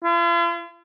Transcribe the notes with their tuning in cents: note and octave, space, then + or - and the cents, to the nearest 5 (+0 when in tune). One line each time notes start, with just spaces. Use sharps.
F4 -45